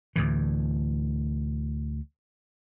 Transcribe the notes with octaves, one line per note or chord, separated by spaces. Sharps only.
D2 A2 E3